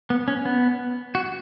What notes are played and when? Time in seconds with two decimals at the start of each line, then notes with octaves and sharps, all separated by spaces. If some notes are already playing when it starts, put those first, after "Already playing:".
0.10 B3
0.28 C#4
0.45 B3
1.15 F#4